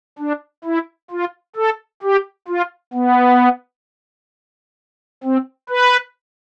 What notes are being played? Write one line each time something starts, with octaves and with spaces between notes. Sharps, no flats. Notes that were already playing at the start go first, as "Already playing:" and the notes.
D4
E4
F4
A4
G4
F4
B3
C4
B4